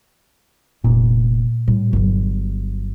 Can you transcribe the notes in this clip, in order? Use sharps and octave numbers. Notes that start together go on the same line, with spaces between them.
F1 A#2
A2 G3
G1 F#3